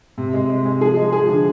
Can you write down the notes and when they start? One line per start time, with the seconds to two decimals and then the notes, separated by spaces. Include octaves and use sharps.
0.18 C3
0.34 G#3
0.49 G#3
0.65 G#3
0.81 F3 G#4
0.97 G#3
1.12 F3 G#4
1.28 D3